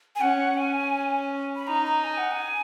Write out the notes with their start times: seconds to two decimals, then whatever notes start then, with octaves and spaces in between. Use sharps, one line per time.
0.16 G#5
0.20 C#4 F#5
0.57 C#4 G#5
1.56 B5
1.67 D#4 A#5
1.85 A#5
2.04 G#5
2.18 F#5
2.31 G#5